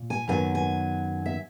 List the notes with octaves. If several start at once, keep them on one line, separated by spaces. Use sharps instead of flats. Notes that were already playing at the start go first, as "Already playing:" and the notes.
Already playing: A#2
G#5
F#2 D#3 F#3 B3 G#5
G#5
E5